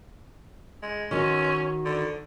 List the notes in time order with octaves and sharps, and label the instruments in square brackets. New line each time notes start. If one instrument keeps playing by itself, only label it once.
[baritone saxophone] G#3
[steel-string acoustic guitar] D#3 F#4 [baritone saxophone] C#4
[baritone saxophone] D3